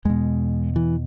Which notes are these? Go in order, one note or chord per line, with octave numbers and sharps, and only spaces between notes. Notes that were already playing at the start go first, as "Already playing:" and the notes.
E2 B2 G#3
E3